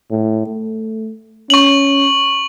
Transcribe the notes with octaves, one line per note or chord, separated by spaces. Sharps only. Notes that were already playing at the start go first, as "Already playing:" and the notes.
A2
A3
C#4 C#6 F#7